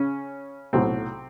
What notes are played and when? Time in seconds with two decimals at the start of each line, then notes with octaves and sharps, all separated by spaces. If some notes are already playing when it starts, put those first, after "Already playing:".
Already playing: C#3 C#4
0.73 B1 A2 C3 F#3 C4